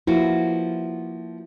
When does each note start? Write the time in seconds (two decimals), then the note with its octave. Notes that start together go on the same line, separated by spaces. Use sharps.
0.07 F3 A#3 E4 F#4